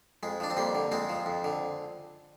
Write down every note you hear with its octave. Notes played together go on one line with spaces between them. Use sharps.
F2 G#3
F3 D4
C4
F2 G3 A#3
D3
F2 G#3 C4
F3
F2
D3